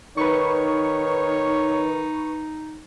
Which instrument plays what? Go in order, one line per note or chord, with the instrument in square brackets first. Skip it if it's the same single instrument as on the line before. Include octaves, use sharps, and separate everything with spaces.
[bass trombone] D#3 [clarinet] D#4 [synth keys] B4 C#6 [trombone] C#5